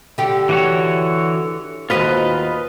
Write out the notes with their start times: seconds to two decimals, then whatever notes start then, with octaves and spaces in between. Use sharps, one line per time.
0.18 D3 G4
0.49 E3 F#4 C#5
1.90 D#2 F4 F#4 B4 C5 D#5